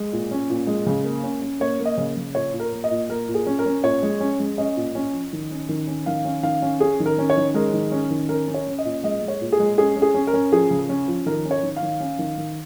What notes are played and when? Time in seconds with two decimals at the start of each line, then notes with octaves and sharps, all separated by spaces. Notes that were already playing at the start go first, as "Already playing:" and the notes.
Already playing: G#3
0.13 A#2
0.31 C#4
0.50 A#2
0.67 G#3
0.86 C#3
1.04 A#3
1.23 C#4
1.42 C#4
1.60 A#3 C#5
1.80 A#3
1.85 D#5
1.97 C#3
2.17 C#3
2.35 A#2 C#5
2.53 A#2
2.60 A#4
2.73 A#3
2.84 D#5
2.91 A#2
3.09 A#3 A#4
3.28 A#2
3.35 G#4
3.46 C#4
3.59 A#4
3.66 C#4
3.83 A#2 C#5
4.03 G#3
4.20 C#4
4.39 G#3
4.58 C#4 D#5
4.76 A#2
4.95 C#4
5.13 F3
5.33 D#3
5.51 C#4
5.69 D#3
5.87 C#4
6.06 D#3 F5
6.25 C#4
6.43 D#3 F5
6.62 C#4
6.80 C#4 G#4
7.00 D#3
7.06 A#4
7.18 C#4
7.30 C#5
7.37 D#3
7.54 G#3 A#4
7.74 D#3
7.92 C#4
8.10 D#3
8.29 C#4 A#4
8.47 C#4
8.54 C#5
8.67 C#4
8.79 D#5
8.85 A#2
9.03 G#3 D#5
9.22 G#3
9.28 C#5
9.41 A#2
9.52 G#4
9.59 G#3
9.78 C#4 G#4
9.96 C#4
10.02 G#4
10.14 C#4
10.27 A#4
10.34 C#4
10.52 F3 G#4
10.70 C#3
10.89 C#4
11.08 F3
11.26 D#3 A#4
11.45 C#4
11.51 C#5
11.63 D#3
11.76 F5
11.82 D#3
12.00 C#4
12.19 D#3
12.38 D#3